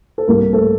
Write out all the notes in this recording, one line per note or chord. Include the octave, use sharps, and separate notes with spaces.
A4
C2 A#3 A#4
A3 A4